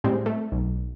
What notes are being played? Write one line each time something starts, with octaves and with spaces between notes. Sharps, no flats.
A2 G3 G#3 C4
A3
B1